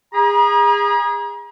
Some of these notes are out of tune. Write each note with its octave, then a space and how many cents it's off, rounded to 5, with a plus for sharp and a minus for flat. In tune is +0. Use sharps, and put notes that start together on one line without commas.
G#4 -25 A#5 +40